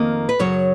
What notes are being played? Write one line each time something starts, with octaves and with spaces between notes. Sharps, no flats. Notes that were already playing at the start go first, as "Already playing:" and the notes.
Already playing: F2 D#3 A#3 D#5
B4
F#2 C#3 F#3 C#5